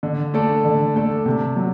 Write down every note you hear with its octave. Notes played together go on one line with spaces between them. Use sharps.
D3
A3 D4 A4 D5
D3
A3 D4 A4 D5
C3
F#3